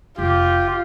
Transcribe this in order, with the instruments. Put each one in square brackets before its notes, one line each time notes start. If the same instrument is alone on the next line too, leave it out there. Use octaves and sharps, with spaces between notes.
[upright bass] F1 [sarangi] F4 [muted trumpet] G4